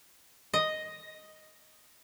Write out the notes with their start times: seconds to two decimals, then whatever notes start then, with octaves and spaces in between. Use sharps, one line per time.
0.54 D#5